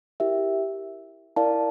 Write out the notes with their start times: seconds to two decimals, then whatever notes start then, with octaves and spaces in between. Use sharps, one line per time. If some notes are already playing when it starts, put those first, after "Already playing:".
0.20 E4 G4 A#4 E5
1.36 E4 A#4 D5 F5 A5